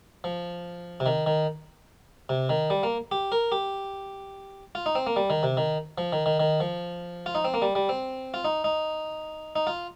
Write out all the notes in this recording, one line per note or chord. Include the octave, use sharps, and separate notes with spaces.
F3
C3
D#3
D#3
C3
D#3
G3
A#3
G4
A#4
G4
F4
D#4
C4
A#3
G3
D#3
C3
D#3
F3
D#3
D#3
D#3
F3
F4
D#4
C4
A#3
G3
G3
C4
F4
D#4
D#4
D#4
F4